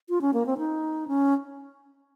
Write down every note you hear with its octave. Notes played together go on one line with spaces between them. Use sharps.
F4
C#4
A#3
C4
D#4
C#4